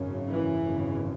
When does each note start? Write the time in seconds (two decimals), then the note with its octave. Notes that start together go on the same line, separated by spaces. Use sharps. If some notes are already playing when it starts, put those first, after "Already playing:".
Already playing: G#1 F#2 C#3
0.28 E3
0.65 G#1 F#2 C#3